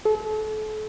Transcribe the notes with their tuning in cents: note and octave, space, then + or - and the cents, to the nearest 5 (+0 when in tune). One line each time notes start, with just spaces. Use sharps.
A4 -35